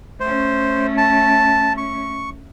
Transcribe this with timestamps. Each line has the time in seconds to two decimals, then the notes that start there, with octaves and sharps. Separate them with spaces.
0.20 A3 C#4 C5
0.97 A5
1.77 C#6